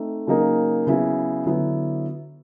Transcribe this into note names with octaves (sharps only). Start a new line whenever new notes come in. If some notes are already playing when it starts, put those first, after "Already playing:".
Already playing: A3 C4 D#4
C#3 F#3 A#3 D#4
C#3 F#3 B3 E4
D3 F#3 B3 E4